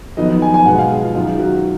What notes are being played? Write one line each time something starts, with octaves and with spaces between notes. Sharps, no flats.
F2 D#3 F#3 B3 D#5
G#5
G#5
B2 G#3 B3 F#5
F5
G#4
F4
F#2 D#3 F#3 F4
F#4